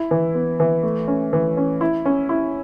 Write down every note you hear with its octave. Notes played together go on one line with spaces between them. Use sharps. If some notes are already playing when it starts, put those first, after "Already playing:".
Already playing: E4
E3
B3
E3
A3
C#4
E3
C#4
E4
C#4
E4